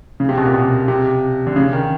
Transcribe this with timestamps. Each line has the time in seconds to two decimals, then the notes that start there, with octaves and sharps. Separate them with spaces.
0.20 C#3
0.29 C3
0.37 B2
0.46 A#2
0.54 B2
0.88 C3
1.47 D3
1.56 C#3
1.73 D#3